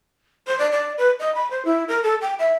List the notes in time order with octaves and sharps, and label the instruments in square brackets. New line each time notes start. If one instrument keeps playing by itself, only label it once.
[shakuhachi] C5
D5
D5
B4
D#5
B5
C5
E4
A#4
A4
G5
E5